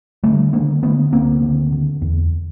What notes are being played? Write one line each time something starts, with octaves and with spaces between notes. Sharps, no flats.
D3 G3 A3
D3 G#3 A#3
D3 A3 B3
D2 A#3 C4
D3
D3
E2